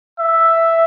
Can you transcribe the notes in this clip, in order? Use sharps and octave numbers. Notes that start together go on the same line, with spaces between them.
E5